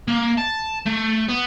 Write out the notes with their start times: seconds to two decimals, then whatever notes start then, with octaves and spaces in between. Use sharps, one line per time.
0.08 A#3
0.38 A5
0.86 A3
1.29 B3